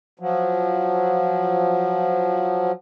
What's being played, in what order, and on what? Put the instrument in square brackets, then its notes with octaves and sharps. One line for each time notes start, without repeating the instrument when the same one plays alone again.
[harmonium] F3 F#3